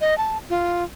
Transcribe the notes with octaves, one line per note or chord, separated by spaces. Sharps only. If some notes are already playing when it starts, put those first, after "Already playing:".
D#5
A5
F4